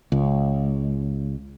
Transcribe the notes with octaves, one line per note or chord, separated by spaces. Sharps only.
C#2